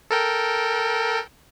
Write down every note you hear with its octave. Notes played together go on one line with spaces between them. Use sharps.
A4 A#4 G5